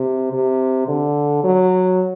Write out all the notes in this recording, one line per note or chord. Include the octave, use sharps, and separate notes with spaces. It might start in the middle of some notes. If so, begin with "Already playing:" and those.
Already playing: C3
C3
D3
F#3